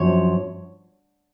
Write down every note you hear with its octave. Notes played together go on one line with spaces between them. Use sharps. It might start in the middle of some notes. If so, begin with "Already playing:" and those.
Already playing: F#2 F3 D4 C#5